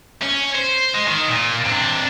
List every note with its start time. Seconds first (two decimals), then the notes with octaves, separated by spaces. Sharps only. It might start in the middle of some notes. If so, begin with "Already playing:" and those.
0.23 C#4
0.55 C5
0.94 G#3
1.07 D#3
1.28 A#2
1.65 C3 D4